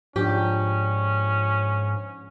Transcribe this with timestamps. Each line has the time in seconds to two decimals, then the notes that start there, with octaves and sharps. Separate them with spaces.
0.16 G#2 F3 C#4 D4 G4